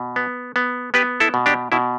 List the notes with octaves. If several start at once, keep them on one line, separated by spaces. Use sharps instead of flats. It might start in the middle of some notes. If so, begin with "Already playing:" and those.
Already playing: B2
B3
B3
B3 G4 B4
E4 A4
B2
D4 G4
B2 E4